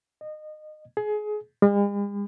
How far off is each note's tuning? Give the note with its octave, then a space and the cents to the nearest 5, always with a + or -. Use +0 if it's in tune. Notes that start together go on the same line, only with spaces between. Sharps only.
D#5 -25
G#4 +25
G#3 -45